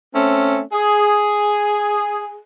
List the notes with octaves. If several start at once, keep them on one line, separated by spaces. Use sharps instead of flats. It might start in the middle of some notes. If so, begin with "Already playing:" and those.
A3 C4 C#4
G#4